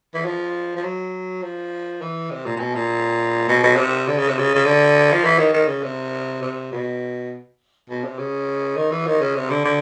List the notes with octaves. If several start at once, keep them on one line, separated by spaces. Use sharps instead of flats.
E3
F3
F3
F#3
F3
E3
C3
A#2
A#2
B2
A#2
B2
B2
C3
D3
C#3
C3
C#3
C#3
D3
F3
E3
D#3
D#3
C#3
C3
C3
B2
B2
C3
C#3
D#3
E3
D#3
C#3
C3
D3
D3